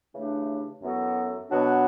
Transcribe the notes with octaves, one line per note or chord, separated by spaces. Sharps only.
C#3 E3 A3 D4 G4
F#2 E3 B3 F#4 A4
B2 F#3 B3 D4 F#4